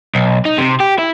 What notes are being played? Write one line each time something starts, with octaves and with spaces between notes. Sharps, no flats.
B1
D#4
C3
G4
E4